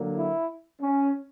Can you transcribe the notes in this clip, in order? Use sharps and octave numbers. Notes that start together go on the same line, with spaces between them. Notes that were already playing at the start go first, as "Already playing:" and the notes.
Already playing: D3 F#3 A#3
E4
C#4